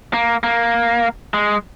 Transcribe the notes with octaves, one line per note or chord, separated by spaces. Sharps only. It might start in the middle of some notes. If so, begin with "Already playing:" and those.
A#3
A#3
G#3